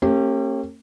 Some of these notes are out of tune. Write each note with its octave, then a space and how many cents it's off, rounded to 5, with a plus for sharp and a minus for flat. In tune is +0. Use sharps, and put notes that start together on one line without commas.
A#3 -45 C#4 -35 G4 +0